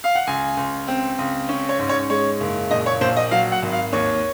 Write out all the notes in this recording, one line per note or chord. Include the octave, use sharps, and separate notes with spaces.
F5
F#5
C#2 G#5
C#2
C4
C#2
C#4
C#5
G#2
C#5
G#3 C#5
F#1
A#1 D#5
C#5
A#1 C5
D#5
F#3 F5
F#5
G#1
F5
D#2 C#5